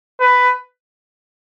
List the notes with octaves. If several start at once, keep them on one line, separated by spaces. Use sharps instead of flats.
B4